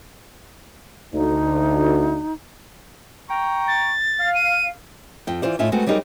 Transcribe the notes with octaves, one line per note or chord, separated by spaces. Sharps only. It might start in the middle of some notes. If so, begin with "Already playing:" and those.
D2 D#4
G5 A#5 C#6
A6
F5
D#7
F2 G5
E3 F4 C5 D5
A2 D#4 F4 E5 G#5
G#3 A3 B3 C4 F#4
F#3 G3 C4 D#4 G#4 A#4